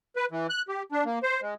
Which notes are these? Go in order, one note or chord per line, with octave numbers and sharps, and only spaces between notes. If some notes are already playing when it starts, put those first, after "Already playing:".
B4
E3
F#6
G4
D4
A#3
C5
G#3